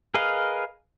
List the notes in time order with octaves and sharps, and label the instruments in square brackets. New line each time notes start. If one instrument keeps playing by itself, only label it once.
[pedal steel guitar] G#4 A#4 B4 D#5 F5